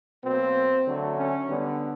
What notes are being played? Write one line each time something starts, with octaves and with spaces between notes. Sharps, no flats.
B2 F#3 A#3 C4
D3 F#3 A3
C#4
D3 G3 B3